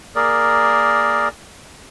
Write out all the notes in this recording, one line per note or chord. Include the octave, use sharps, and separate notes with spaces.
A#3 G#4 A#4 D5